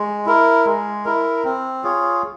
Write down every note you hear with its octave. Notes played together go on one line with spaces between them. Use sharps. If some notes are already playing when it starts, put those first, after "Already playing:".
Already playing: G#3
E4 A#4
G#3
E4 A#4
C4
F4 G#4 C#5